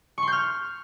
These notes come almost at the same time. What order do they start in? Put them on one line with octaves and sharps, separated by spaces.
C#6 C6 G6 F6